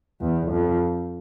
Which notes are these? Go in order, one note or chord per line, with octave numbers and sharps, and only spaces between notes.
E2
F2